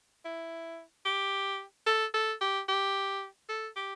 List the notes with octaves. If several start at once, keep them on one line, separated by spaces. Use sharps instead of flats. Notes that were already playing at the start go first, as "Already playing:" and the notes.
E4
G4
A4
A4
G4
G4
A4
G4